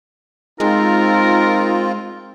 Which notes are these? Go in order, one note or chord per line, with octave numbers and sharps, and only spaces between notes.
G#3 C4 D#4 F4 A#4